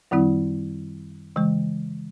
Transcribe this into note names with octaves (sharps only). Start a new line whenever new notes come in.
F#2 D#3 G3 C4 E4
C#3 E3 G#3